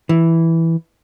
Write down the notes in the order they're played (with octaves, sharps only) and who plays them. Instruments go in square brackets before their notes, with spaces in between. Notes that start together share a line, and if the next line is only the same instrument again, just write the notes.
[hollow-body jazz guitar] E3